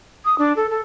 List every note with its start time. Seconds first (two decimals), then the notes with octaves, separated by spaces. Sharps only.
0.25 D#6
0.38 D4
0.56 A4
0.70 A4